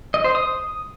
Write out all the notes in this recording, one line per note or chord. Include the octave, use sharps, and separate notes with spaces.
D#5
C5
D#6